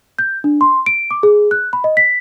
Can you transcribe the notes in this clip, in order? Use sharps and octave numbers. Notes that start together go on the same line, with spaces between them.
G6
D4
C6
D7
D6
G#4
F#6
B5
D#5
B6